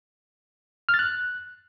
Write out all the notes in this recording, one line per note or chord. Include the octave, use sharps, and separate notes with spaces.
F6
A6
F#6